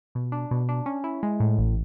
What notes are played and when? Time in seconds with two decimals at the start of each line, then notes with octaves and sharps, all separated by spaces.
0.15 B2
0.32 D4
0.51 B2
0.69 D4
0.86 C#4
1.04 E4
1.23 G#3
1.40 A2
1.58 A1